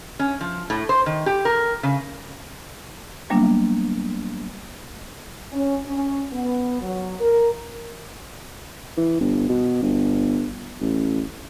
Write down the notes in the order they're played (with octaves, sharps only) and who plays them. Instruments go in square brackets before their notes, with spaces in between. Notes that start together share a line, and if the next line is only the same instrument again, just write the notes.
[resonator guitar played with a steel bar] C#4
F3
A2
C5
D#3
G4
A#4
C#3
[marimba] F#3 G3 A#3 B3 D4
[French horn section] C#4
C#4
B3
F#3
A#4
[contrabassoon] E3
G1
B2
G1
A1